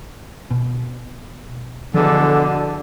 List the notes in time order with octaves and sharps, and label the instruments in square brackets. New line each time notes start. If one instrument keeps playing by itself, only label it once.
[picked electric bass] B2
[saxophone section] E2 B2 D3 [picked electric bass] F3